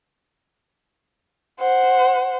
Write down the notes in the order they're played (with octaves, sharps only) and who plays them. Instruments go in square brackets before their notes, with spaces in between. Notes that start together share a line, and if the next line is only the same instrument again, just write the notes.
[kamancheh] C5 F#5